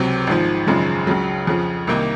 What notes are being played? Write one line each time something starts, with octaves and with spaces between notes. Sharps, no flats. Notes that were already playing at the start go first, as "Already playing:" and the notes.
Already playing: C#2 C3 F#3 C4
G#1 G#2 F3
G#1 F#2 C#3 F3 G#3
C#2 C#3 F#3
F2 C#3 F3
C2 C3 D#3 A#3 D#4